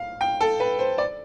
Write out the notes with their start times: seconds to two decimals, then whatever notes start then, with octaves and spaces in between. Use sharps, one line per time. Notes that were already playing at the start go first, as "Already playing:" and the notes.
Already playing: F5
0.21 G5
0.41 A4
0.60 B4
0.79 C5
0.98 D5